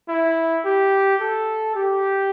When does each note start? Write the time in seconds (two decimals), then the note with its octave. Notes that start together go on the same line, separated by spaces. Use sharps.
0.08 E4
0.65 G4
1.20 A4
1.75 G4